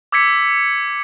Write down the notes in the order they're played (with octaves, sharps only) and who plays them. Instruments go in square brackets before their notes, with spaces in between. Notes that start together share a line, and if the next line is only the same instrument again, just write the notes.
[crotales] D6 E6 G#6 B6 C#7